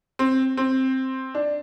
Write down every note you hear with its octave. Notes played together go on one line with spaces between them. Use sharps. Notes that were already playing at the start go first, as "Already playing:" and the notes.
C4
C4
D4